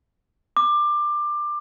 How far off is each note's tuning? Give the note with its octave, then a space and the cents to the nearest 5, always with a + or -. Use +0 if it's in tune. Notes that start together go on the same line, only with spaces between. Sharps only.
D6 +20